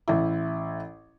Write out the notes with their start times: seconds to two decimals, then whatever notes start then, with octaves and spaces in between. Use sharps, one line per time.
0.08 A1 E4